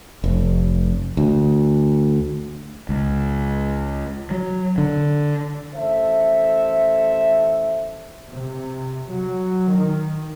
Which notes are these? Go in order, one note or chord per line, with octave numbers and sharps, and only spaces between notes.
F1
D2
C#2
F#3
D3
A1 A4 C5 E5
C3
F#3
D#3